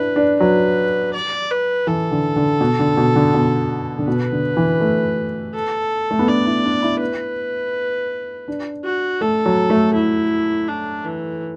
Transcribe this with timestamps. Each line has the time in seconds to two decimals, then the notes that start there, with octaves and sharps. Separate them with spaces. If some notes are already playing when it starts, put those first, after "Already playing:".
Already playing: D4 E4 B4
0.16 D4
0.40 F#3 B4
1.14 D5
1.51 B4
1.87 E3 A4
2.11 D3
2.36 D3
2.61 B2
2.79 D3
2.97 B2
3.16 D3
3.34 B2
3.99 D3
4.08 B2 B4
4.32 D3
4.57 E3
4.81 A3
5.54 A4
6.11 A3
6.19 B3
6.28 D4 D5
6.46 E4
6.64 D4
6.82 E4
7.01 B4
8.48 D4
8.85 F#4
9.21 A3 A4
9.46 F#3
9.70 A3
9.95 E4
10.68 D4
11.05 E3